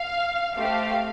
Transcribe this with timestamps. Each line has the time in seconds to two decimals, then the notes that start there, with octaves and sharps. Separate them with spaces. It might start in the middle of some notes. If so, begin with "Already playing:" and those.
Already playing: F5
0.55 A3 C4 G4 F5